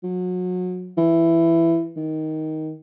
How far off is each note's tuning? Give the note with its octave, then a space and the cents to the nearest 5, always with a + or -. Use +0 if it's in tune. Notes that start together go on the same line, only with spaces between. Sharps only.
F#3 -30
E3 +10
D#3 +10